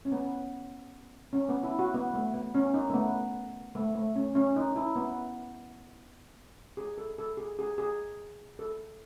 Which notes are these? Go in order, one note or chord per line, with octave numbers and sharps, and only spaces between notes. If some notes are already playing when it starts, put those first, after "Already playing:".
C#4
B3
C#4
B3
E4
F#4
B3
A3
B3
C#4
D#4
A3
B3
A3
A3
C#4
C#4
D#4
E4
B3
G#4
A4
A4
G#4
G#4
G#4
A4